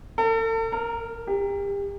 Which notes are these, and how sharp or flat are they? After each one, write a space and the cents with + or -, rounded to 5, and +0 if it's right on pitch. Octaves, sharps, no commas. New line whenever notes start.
A4 +40
A#4 -10
G4 +35